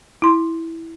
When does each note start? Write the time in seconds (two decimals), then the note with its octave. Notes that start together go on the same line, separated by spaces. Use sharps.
0.22 E4 C6